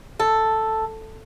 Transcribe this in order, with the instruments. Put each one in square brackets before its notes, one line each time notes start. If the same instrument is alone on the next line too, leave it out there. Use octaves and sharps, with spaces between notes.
[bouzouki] A4